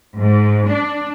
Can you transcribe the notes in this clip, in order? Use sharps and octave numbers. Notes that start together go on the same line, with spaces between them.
G#2
D4